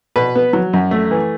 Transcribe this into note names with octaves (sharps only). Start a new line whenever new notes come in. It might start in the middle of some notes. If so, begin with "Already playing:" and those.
B2 B4
B3
F#3
F#2
A3
E3